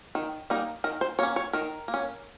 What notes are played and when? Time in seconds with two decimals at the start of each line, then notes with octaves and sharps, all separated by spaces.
0.15 D#3
0.50 G3 A#3 D#4
0.84 D#3 A#4
1.01 C5
1.19 A#3 C#4 C#5
1.36 C#5
1.53 D#3 A#4
1.88 A#3
1.94 C#4